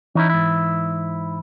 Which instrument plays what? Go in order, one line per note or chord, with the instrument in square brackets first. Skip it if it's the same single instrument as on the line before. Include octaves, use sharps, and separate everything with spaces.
[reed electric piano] E3 [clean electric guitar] C#4 D#4 E4
[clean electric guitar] G#2 E4